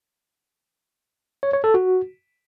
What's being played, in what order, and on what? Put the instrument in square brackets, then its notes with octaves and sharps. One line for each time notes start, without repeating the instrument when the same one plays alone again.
[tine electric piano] C#5
C#5
A4
F#4